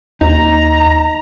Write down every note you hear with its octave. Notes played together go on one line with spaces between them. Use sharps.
D#2 D#4 A#5